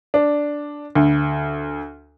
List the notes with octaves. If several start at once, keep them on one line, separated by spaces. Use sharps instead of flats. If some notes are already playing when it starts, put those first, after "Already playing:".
D4
D2